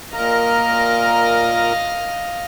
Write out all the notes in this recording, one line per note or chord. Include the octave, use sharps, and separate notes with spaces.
A#2 A#4 D#5 F5 A#5